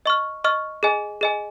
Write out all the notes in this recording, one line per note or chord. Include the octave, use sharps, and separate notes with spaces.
D#5 C#6 F6
D#5 C#6 F6
G#4 D#5 G#5
G#4 D#5 G#5